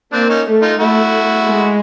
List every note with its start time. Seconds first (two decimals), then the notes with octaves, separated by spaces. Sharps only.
0.13 A#3 C4 D4
0.29 C#4 D#4
0.46 A3
0.62 D#4 F4
0.80 A3 E4 F#4
1.46 G#3